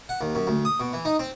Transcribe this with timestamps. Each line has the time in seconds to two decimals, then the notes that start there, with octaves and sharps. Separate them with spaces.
0.09 F#5
0.21 D#2
0.35 F#2
0.47 D2
0.65 D#6
0.80 B2
0.93 E3
1.05 D#4
1.19 C4